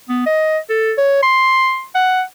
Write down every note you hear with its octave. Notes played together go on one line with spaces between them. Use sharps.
B3
D#5
A4
C#5
C6
F#5